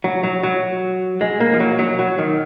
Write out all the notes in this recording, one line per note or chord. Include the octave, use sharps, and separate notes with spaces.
F#3
F#3
F#3
G#3
A#3
F3
F#3
F#3
F#3
D#3